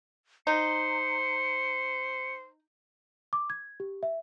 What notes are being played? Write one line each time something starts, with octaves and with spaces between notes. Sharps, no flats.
D#4 C5 C#7
D6
G#6
G4
E5